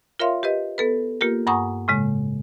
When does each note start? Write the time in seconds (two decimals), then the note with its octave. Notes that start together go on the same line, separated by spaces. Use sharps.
0.19 F4 A#4 C#5 E5 F5 C6
0.43 G4 B4 D#5
0.78 B3 A4 B4
1.21 A#3 F4 G4 A#4
1.47 G2 F#5 G#5 A#5 C#6 D#6
1.88 A2 C#3 G#3